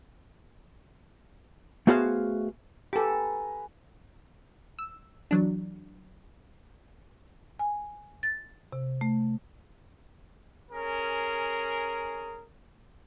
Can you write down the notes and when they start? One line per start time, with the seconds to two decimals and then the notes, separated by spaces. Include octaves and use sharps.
1.87 A3 B3 F#4 G#4 C5 F5
2.93 G4 A4 B4 G#5 A#5
4.79 E6
5.31 E3 F#3 D4
7.59 G#5
8.23 A6
8.72 C3
9.01 A3
10.71 C#4 G#4 A#4